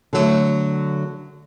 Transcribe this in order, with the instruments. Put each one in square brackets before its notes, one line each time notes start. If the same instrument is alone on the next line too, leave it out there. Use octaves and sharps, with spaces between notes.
[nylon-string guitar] D3 F#3 A3